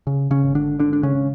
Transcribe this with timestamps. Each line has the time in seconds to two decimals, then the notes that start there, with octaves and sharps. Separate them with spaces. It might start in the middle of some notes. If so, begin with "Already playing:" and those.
0.07 C#3
0.31 C#3 C#4
0.43 G#1
0.55 D3 D4
0.79 G#1 D3 D4
0.93 D4
1.03 C#3 C#4
1.15 C#3